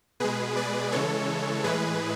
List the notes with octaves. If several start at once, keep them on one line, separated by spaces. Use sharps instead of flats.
B2 G#3 G#4 B4
B4 D5
C#3 E3 G#3 A4 C#5
A2 E3 G#3 G#4 B4